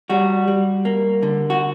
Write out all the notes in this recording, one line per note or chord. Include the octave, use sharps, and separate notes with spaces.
G3 F#4
G3
A#3
D3
F#4